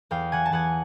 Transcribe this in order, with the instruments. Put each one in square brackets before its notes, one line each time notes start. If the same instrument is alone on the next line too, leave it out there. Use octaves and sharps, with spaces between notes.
[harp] E2 F5 G5
E3 F#5 G#5
A5
E2 F#5 G#5